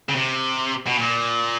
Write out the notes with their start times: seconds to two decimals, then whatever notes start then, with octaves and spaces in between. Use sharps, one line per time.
0.09 C#3
0.15 C3
0.87 B2
0.98 A#2